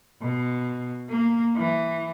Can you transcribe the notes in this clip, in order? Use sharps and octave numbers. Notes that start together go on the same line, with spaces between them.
B2
A#3
E3